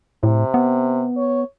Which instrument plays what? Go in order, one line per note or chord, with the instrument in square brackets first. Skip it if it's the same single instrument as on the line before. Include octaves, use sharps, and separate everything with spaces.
[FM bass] A2 [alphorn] C3
[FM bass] B3
[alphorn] C#5